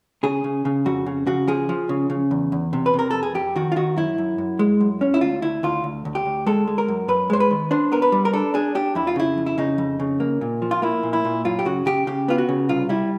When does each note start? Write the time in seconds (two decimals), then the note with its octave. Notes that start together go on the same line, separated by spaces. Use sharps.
0.23 C#3 G#4
0.44 C#3
0.65 C#3
0.86 F2 F#4
1.06 C#3
1.27 C#3 F#4
1.48 F3 G#4
1.69 F3
1.89 C#3
2.10 C#3
2.31 E2
2.52 E2
2.73 C3
2.86 B4
2.94 C3 A#4
3.11 F2 A4
3.23 G#4
3.35 F2 G4
3.56 D#3 F#4
3.72 F4
3.76 D#3 F#4
3.96 F#2 E4
4.18 F#2
4.38 F#2
4.59 G#3
4.80 F#2
5.01 C#4
5.14 E4
5.21 D2 F4
5.42 D2 E4
5.63 D2 F4
5.84 D2
6.05 D2
6.15 G4
6.25 D2
6.46 G#3 A4
6.67 G#3
6.78 A#4
6.88 F#2
7.08 F#2 B4
7.30 G#3 C5
7.40 B4
7.51 D#3
7.71 D4 C5
7.92 B3 A#4
8.02 B4
8.12 G3
8.25 A#4
8.33 D4 A4
8.54 D4 G#4
8.75 D4 G4
8.95 F2 E4
9.07 F4
9.16 C#3 E4
9.38 F2
9.46 E4
9.58 C#3 D#4
9.78 F2
10.00 C#3
10.20 A#3
10.41 A#2
10.62 F3
10.71 F4
10.82 A#3 E4
11.03 A#2
11.13 E4
11.25 A#2
11.45 F#2 F4
11.59 G4
11.65 C#3 F#4
11.86 C#3 G4
12.07 C#3 G4
12.28 B3 F4
12.38 F#4
12.49 C#3
12.69 C2 F4
12.89 G3 E4